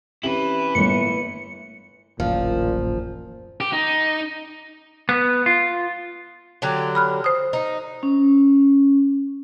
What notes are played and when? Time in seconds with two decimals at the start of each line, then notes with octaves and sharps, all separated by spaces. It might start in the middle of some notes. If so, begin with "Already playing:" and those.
0.23 C4 C#4 E4 G4 B4 F#7
0.75 G1 A2 A#3 C#7
2.20 D1 A1 F#2 A#2 F3
3.60 G4
3.73 D#4
5.09 B3
5.46 F4
6.62 D3 F#3 G4
6.95 B5 F6 F#6
7.24 C5 D#6
7.53 D#4
8.03 C#4